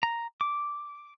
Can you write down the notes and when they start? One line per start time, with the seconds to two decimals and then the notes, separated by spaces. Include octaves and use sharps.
0.03 A#5
0.41 D6